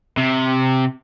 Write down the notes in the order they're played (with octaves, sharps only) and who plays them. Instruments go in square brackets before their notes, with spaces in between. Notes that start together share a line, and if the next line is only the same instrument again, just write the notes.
[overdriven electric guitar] C3